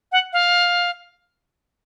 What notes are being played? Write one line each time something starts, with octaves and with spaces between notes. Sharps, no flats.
F#5
F5